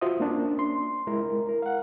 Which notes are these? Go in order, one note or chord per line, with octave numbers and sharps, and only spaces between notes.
F4 F#4 C5 E5 D#6
A#3 C#4 D4
C6
G#3 E4 A#4
A#4
F5 F#5